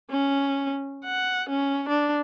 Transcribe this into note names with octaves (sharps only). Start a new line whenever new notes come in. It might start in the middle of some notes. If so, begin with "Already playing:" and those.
C#4
F#5
C#4
D4